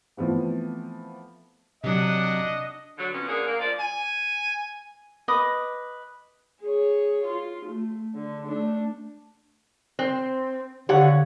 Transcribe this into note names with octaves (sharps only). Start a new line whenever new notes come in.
E3 F3 A3 B3 C4
C3 F#3 D4 D#5 F#5
D3 F#3
F2 B3 C#4
D3 A#3 D4 G#4
A#3
F3 D5
G#5
B4 D#5 D6 D#6
G#4 C#5
F4
A3
D3
A3 D4
C4 C5
D3 G4 C5 C#5 F5 F#5